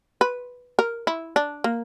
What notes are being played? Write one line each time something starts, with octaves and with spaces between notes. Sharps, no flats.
B4
A#4
E4
D4
A#3